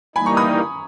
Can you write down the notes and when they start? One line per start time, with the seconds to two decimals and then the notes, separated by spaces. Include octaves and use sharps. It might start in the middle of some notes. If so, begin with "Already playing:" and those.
0.16 E3 G3 A#3 D#4 G#5 B5
0.26 A#5 C#6
0.37 B5 D#6